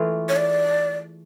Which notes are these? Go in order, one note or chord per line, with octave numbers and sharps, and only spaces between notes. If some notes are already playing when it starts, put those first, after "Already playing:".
Already playing: E3 A3 F4 G#4
C#5
D5